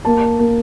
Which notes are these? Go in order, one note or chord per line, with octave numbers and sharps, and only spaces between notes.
A#3 A5
A#3